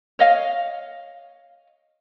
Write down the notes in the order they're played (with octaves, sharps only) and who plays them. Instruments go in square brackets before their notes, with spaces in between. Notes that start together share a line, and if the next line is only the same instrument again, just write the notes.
[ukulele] C#5 D#5 F5